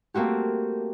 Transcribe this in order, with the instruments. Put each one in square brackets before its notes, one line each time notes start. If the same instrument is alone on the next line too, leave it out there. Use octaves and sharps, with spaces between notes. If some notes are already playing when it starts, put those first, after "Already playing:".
[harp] A3 A#3 C4 F#4 G4